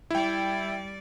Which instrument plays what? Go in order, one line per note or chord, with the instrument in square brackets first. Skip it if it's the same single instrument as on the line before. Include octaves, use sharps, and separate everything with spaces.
[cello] G3 D5 [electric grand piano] E4 G5